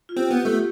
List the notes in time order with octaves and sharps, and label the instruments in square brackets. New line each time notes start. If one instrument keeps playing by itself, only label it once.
[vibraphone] F4
[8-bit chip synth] C4 [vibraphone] G4
[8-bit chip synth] B3
[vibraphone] G4
[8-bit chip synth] A3